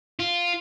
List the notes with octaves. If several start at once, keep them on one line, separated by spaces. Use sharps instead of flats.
F4